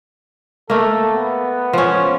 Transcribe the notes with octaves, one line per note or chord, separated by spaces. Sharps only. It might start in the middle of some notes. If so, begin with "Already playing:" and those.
A3 A#3 A4
B3
F3 C#4